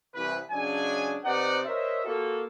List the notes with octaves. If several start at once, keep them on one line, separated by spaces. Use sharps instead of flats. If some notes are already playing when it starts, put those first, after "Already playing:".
C2 E3 B4
C#3 F#3 G#3 D4 G#5
C3 D#4 B4 C5 D5 F#5
A#4 C5 C#5 D#5 E5
A#3 F4 F#4 A4